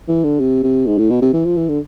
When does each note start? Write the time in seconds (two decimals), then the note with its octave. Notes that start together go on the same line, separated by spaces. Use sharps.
0.08 E3
0.24 D3
0.40 C3
0.63 C3
0.86 G#2
0.98 A2
1.10 B2
1.22 C3
1.33 E3
1.45 F3
1.57 E3
1.69 D3